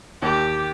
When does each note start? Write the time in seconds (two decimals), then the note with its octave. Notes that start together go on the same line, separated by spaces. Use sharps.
0.22 D#2 G4